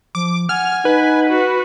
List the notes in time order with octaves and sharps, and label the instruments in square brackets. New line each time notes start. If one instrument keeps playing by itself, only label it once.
[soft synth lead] F3 [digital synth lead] D6
[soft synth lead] F#5 [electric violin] G#5 [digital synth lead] F6
[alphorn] D#4 [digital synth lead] B4
[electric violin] F#4